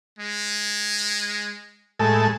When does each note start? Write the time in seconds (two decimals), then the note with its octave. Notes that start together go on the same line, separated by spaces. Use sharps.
0.19 G#3
1.99 A2 G#3 A4